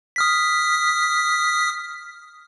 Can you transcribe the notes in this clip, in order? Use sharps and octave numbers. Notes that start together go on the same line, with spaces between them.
D#6 F6 B6